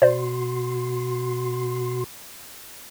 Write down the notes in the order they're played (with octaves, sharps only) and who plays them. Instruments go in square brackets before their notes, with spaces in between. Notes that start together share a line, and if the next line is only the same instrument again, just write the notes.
[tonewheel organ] B2 F#4 C6 [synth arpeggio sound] C5 D5